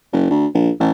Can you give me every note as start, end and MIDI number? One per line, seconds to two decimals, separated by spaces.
0.13 0.29 30
0.30 0.46 38
0.54 0.70 34
0.80 0.91 33